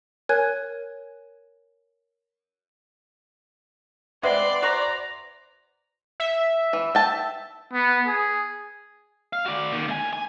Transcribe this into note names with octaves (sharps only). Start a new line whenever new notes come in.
A#4 C#5 G#5 F#6 G#6
G#3 C4 B4 D5 E5 F#5 C6
F#4 C5 A#5 C#6
E5
E3
G5 A5
B3
G#4
F5
F#4 D5
A#2 D#3
D2 G#5
G#5